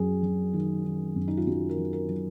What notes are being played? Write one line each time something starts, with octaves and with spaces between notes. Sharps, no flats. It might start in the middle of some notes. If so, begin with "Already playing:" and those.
Already playing: F#2 F#3 G#4
F#3
D#3
D#3
F#2
D#4
F4
F#2 F#4
A#4
F#3
A#4
F#3